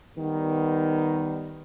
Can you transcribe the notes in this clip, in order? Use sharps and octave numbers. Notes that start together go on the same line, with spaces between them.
D#3 G3 B3